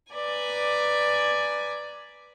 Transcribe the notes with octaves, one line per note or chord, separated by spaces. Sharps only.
B4 D5 G#5 A#5